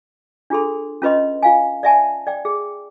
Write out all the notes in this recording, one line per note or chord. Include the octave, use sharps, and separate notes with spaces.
D4 F4 G#4 A4 C6
C#4 F4 B4 D#5 C6
F4 F5 G#5
D5 E5 G#5 A5
D5 G5
G#4